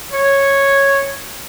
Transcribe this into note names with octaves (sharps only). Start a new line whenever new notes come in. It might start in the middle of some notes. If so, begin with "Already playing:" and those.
C#5